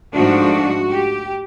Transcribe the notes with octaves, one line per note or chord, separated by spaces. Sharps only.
G#2 F3 A3 D4 F#4
G4